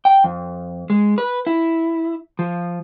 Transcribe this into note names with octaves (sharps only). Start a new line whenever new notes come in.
G5
F2
G#3
B4
E4
F3